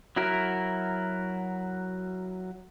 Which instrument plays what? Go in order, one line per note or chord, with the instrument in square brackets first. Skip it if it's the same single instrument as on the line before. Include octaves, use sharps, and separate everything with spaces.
[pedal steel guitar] F#3 E4 F#4 A#4